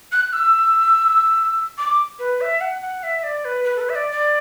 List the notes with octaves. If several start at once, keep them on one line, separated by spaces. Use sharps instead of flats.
F#6
E6
D6
B4
E5
F#5
F#5
E5
D5
B4
B4
A4
B4
E5
D5
D5